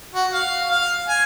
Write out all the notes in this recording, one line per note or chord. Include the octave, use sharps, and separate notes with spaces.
F#4
F5
F5
G#5